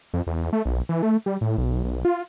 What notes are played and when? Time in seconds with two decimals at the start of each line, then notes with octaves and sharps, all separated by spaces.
0.14 F2
0.27 E2
0.53 A3
0.65 B1
0.89 E3
1.03 A3
1.26 G3
1.41 A2
1.58 B1
1.84 B1
2.05 F4